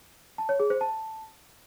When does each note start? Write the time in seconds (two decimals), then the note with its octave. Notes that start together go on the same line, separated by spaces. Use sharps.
0.38 A5
0.49 C#5
0.60 G#4
0.70 C5
0.81 A5